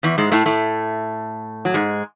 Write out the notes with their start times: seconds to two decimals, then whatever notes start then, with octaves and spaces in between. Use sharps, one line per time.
0.03 E2 E3
0.18 G#2 G#3
0.32 A2 A3
0.46 A2 A3
1.65 F#3
1.74 G#2 G#3